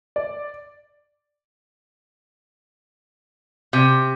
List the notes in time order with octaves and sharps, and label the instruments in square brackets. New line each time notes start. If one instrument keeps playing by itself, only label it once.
[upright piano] D5
[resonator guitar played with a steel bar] C3